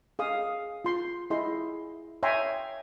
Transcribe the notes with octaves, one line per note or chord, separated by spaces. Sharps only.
G#4 F5 D#6
F4 C6
E4 G#4 D#5 C6
C#5 E5 G5 G#5 A#5 C6